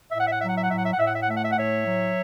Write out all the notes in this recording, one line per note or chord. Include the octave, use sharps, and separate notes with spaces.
A2 E5
F#5
E5
F#5
F#3 E5
F#5
E5
F#5
A2 E5
F#5
E5
F#5
A2 E5
F#5
E5
F#5
A3 E5
F#5
E5
F#5
A2 C#5 E5
F#3